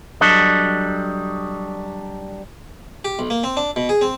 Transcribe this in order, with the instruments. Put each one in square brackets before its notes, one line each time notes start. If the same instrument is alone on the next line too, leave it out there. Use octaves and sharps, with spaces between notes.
[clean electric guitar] F#3 G3 D4 A4 D#5
[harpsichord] G4
B1
A#3
C4
D4
B2
G#4
C4